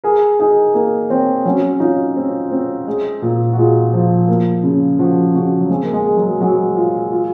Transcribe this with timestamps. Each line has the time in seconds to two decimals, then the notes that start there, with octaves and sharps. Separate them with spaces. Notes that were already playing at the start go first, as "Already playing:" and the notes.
0.04 G#4 A#4
0.39 D#4 G#4
0.74 A#3 D#4
1.10 C4 C#5
1.45 F#3 C#4
1.80 D#4 F4
2.16 C4
2.51 C4
2.87 G#3
3.22 A#2
3.53 F#4
3.57 G#3 F4
3.93 F3
4.28 A#3
4.64 C#3
4.99 F3 F#4
5.35 C#3 F#4
5.61 F#3
5.70 G#3 C4
5.83 A#3
5.93 G#3
6.06 G#4
6.17 F#3
6.41 F#3 G#3
6.76 F4
7.12 F4